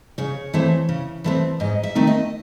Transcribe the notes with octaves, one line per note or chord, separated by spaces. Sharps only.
C#3 C#5
E3 A3 C4
C#3
E3 A3 C4
G#2 D#5
E5
D#3 A3 C4 D#4
D#5